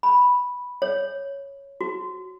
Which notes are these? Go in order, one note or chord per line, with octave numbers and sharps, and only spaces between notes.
B5
C#5
F#4